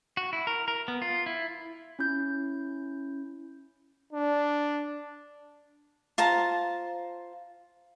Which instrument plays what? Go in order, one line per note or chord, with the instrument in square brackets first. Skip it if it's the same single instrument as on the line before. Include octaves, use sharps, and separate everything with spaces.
[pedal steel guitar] F#4
E4
A#4
A#4
B3
F4
E4
[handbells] C#4 E4 G6
[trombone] D4
[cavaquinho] F4 C5 A5 A#5